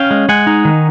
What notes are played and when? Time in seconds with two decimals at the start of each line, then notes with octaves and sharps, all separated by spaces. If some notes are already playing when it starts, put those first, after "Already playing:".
Already playing: C#4 F5 G5
0.11 G#3
0.29 G#3 F#5 G#5
0.47 D#4
0.65 D#3